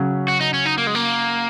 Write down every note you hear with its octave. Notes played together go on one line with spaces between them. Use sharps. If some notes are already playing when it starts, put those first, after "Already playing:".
Already playing: C#3 F#3 C#4
F#4
D#4
C#4
D#4
A#3
G#3
A#3